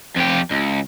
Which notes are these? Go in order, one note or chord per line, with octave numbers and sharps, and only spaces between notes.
F2 G4
C#2